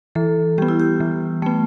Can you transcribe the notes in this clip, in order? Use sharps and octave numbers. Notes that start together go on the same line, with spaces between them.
E3 A4
G3 B3 G4
E4
G4
E3
G3 A3 B3